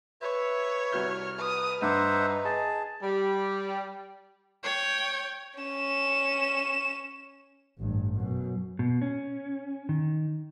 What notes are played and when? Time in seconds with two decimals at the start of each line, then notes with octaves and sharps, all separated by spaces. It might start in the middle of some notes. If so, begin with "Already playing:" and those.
0.22 B4 C#5 E5
0.92 C2 F#4 F6 G6
1.39 B4 D#6
1.82 G2 D#4 C5 E5 F#5 D6
2.45 G#4 D#5 A5
3.03 G3
4.64 C#5 G5
5.60 C#4 E7
7.79 A1 G2
8.16 F#2 B2
8.79 B2
9.02 C#4
9.89 D#3